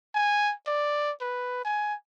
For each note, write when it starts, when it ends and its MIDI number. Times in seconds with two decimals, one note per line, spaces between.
0.15 0.54 80
0.67 1.11 74
1.21 1.63 71
1.65 1.95 80